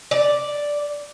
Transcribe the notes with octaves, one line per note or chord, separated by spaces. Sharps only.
D5